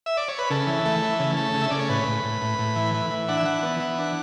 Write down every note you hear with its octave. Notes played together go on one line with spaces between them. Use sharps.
E5
D5
C#5
B4
C#3 A4
E3
A3
E3
C#3
A3
C#3
E5
C#3 D5
C#5
A2 B4
A2
A2
A2
A2
E3
E3
E3
D4 F#5
E5
E3 F#5
B3
E3
D4